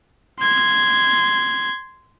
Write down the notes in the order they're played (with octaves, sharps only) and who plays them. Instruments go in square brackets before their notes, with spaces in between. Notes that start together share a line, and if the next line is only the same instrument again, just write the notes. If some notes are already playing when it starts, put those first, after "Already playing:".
[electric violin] C6 G#6